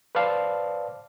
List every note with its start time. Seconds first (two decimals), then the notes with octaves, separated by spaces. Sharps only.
0.15 B4 C5 D5 F5 A5